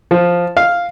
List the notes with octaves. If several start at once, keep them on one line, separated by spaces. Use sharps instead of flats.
F3
F5